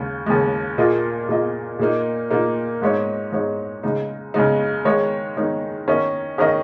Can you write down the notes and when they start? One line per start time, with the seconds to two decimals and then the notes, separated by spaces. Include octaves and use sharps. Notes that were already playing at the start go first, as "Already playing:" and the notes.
Already playing: D#2 C#3 G#3
0.26 D#2 C#3 G#3
0.78 A#2 A#3 F4 G#4 D#5
1.28 A#2 A#3 F4 G#4 D#5
1.79 A#2 A#3 D#4
2.31 A#2 A#3 D#4
2.82 G#2 G#3 D#4 C#5
3.32 G#2 G#3 D#4 C#5
3.83 C#3 G#3 D#4
4.34 C#3 G#3 D#4
4.85 D#3 G#3 D#4 C#5
5.37 D#3 G#3 D#4 C#5
5.88 D#3 C#4 A#4 D#5
6.38 D#3 C#4 A#4 D#5